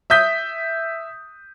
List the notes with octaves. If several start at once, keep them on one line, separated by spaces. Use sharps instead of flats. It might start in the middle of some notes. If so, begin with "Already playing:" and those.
E5 D#6 G6 B6